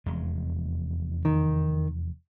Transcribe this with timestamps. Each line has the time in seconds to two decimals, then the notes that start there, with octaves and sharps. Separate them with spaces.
0.06 F1 E2 G#3
1.25 D#3